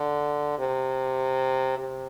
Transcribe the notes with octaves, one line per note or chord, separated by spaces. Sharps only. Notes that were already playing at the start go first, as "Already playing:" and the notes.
Already playing: D3
C3
C3